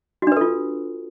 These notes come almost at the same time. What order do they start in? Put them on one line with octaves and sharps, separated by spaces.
F#4 D4 B4 A4 F4